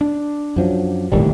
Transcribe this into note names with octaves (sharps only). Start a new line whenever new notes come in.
D4
F#2 F3 F#3
D#1 C2 A2 D3 D#3 G3